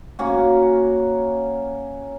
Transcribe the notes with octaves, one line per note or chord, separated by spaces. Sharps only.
A#3 C#4 F#4